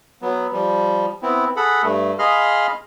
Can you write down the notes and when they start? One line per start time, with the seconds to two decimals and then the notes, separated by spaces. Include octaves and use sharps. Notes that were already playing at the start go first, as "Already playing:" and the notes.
0.22 F#3 B3
0.53 F3 G3
1.22 B3 C4 E4
1.56 G#4 A4 F#5 B5
1.83 G2 A3
2.19 G#4 D#5 F5 B5 C6 F6